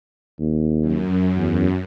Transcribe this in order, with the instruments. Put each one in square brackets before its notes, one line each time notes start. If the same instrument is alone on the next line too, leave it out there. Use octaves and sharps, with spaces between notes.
[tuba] D#2
[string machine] F#2
[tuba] E2